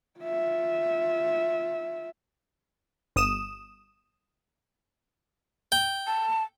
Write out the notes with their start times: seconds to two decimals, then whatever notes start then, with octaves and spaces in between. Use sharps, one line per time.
0.20 F4 E5
3.16 G1 D#6 E7
5.72 G5
6.07 A5